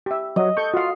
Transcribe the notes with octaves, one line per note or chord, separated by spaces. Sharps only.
G4 E5
F#3 D#5
A4 C#6 G6
F4 F#4 F5